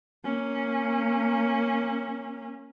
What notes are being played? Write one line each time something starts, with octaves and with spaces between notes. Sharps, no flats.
A#3 C#4